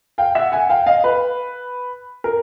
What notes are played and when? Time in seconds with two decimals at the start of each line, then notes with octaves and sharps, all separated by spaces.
0.18 F5 G5
0.35 E5 F#5
0.52 F#5 G#5
0.69 F5 G5
0.86 D#5 F5
1.04 B4
2.24 A#4